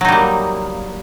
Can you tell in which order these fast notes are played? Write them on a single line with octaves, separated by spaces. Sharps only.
F#3 D#4 G3 A#3